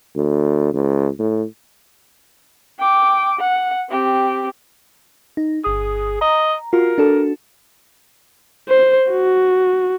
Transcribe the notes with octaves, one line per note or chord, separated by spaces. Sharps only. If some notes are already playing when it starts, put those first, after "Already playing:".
D2
C#2
A2
G5 D6
F#5
C4 G4
D#4
G1 G#4 D#6
D#5 A#5
F4 F#4 A#4
D4 F#4 A4
C5
F#4